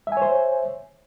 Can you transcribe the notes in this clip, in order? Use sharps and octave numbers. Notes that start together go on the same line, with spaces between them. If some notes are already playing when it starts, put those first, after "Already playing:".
C5 C#5 E5 G#5